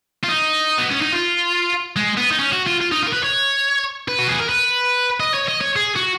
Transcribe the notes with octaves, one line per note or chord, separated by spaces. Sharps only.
F4
D#4
B3
C#4
D#4
F4
G#3
B3
D#4
C#4
F#4
F4
F4
D#4
F4
A#4
B4
C#5
B4
F#4
G#4
A#4
B4
D#5
C#5
D#5
C#5
G#4
F#4